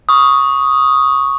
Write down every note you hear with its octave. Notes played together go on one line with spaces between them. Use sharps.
C#6 D#6